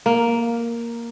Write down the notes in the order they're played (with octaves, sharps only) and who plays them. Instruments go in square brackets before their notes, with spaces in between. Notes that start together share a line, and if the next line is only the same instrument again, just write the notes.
[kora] A#3